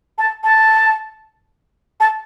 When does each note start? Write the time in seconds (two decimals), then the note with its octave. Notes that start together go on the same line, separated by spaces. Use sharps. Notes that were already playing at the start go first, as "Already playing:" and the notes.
0.18 A5
0.44 A5
2.00 A5